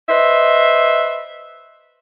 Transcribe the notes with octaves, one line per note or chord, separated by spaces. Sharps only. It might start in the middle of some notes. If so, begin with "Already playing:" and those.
B4 C5 D#5 E5